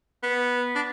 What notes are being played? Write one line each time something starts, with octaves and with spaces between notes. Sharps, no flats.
B3
D4